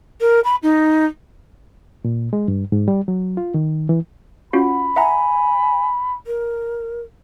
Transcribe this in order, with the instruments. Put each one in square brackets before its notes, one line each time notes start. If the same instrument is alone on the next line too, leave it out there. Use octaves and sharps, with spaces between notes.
[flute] A#4
B5
D#4
[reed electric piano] A#2
G#3
G2
G#2
G3
F#3
F4
D#3
E3
[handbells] C#4 F4 F#4 [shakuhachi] F#5 [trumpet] B5
[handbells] E5 F#5 A#5 [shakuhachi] G#5
[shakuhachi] A#4